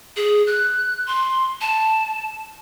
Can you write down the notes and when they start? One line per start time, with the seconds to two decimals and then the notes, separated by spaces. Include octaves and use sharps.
0.17 G#4
0.47 F#6
1.07 C6
1.61 A5